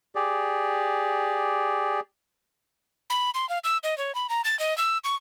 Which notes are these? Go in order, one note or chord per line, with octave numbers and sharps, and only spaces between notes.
G4 G#4 D5
B5
C6
F5
E6
D#5
C#5
B5
A#5
A6
D#5
E6
C#6